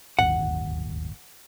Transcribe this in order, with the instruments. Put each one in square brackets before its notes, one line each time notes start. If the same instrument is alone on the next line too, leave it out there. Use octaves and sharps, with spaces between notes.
[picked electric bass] D1 G1 D#2 [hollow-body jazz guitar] F#5